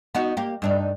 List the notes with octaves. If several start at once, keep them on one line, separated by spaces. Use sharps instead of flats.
B3 D#4 F#4
A#3 G4
G2 D4 D#4